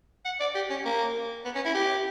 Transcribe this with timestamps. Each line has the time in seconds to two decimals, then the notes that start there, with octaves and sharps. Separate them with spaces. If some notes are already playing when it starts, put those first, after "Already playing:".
0.25 F#5
0.40 D5
0.55 G4
0.70 C#4
0.85 A#3
1.45 B3
1.55 C#4
1.65 E4
1.74 G4